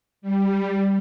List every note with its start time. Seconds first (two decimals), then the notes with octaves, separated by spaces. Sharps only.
0.22 G3